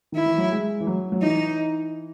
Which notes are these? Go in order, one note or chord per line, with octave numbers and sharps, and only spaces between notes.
D#3 E4
E3
F#3
G#3
E3
F#3
F#3
E3 D#4